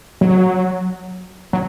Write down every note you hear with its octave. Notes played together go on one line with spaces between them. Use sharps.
F#3
F#3